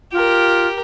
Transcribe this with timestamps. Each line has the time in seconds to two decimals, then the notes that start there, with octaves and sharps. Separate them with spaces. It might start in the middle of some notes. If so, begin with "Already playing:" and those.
0.12 F4 G4 A#4